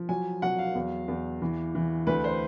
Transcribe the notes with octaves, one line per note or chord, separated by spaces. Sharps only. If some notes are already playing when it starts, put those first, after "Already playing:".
Already playing: F3
F#3 G#5
F#3 F#5
F5
E2
E2
E3
E3
D2 B4
C5